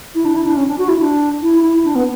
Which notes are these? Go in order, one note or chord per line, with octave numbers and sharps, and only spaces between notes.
E4
D4
E4
D4
C#4
D4
F#4
E4
D4
E4
E4
D4
B3